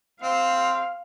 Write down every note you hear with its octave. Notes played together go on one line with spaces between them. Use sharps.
C4 C5 F5